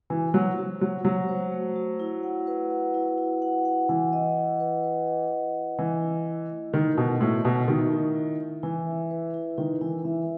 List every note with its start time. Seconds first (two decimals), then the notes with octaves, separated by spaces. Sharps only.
0.10 E3 F#4
0.34 F#3 C5
0.58 F#4
0.81 F#3 F#4
1.05 F#3 A3
1.28 C5
1.52 A3
1.76 F#4
2.00 E4
2.23 F#5
2.47 B4
2.70 F#5
2.94 E4
3.18 E4
3.42 F#5
3.65 F#5
3.89 E3 F#5
4.13 D#5
4.37 E4
4.60 B4
4.84 B4
5.07 D#5
5.31 B4
5.55 D#5
5.79 E3 E4
6.02 E4
6.26 E4
6.50 A3
6.73 D#3 A3
6.97 B2 A4
7.21 A2 A3
7.45 B2 E4
7.68 D#3 E5
7.92 E4
8.15 E4
8.39 E4
8.63 E3 E4
8.87 E5
9.11 B4
9.34 E4
9.58 D#3 E4
9.81 E3 E4
10.04 E3 E5